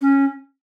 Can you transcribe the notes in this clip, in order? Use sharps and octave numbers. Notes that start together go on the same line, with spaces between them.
C#4